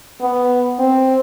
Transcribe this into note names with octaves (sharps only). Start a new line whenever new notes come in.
B3
C4